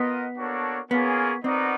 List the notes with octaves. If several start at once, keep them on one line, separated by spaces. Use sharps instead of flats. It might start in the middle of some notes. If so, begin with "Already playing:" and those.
Already playing: B3 F4 A#4 D#5 F#5
A#3 D4 F#4 A4 C#5
A#3 B3 C#4 F4 G#4 C#5
B3 C4 D#4 F#4 A#4 D5